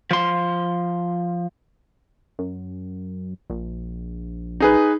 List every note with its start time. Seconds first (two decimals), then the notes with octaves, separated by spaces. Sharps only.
0.11 F3 C6
2.39 F#2
3.50 A#1
4.60 D#4 G#4 B4